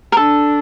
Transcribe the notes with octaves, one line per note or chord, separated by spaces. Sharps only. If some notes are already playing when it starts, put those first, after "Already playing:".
A#4
D4 A4